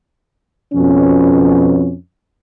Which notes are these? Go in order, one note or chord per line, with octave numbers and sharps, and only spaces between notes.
F2 B2 C#4